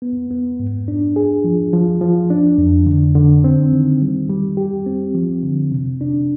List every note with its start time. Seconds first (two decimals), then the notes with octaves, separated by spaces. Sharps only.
0.02 B3
0.31 B3
0.60 G#2
0.88 D4
1.16 G#4
1.44 F3
1.73 F3
2.01 F3
2.30 D4
2.58 F2
2.86 D3
3.15 D3
3.44 C4
3.73 D#3
4.01 G3
4.29 G3
4.57 G4
4.86 C4
5.15 F3
5.43 D3
5.72 C3
6.01 D4